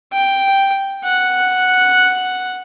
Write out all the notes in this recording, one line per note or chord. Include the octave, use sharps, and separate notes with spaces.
G5
F#5